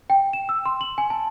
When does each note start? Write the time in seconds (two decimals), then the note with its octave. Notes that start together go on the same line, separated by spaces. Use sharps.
0.10 G5
0.33 E7
0.49 E6
0.66 C6
0.81 F#7
0.98 G#5
1.10 A5